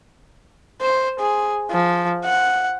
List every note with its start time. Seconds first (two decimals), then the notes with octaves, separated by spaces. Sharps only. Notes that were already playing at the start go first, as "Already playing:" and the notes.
0.81 C5
1.19 G#4
1.71 F3
2.25 F#5